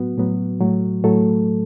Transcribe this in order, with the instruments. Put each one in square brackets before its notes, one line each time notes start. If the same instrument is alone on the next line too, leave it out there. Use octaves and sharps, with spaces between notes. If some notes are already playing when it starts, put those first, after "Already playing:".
Already playing: [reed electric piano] A2 F#3 B3 F#4
A2 F#3 B3
A2 F#3 A3
A2 F#3 A3 A4